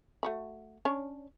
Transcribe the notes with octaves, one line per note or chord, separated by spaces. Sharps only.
A3 F#4 B5
C#4 D4 C#5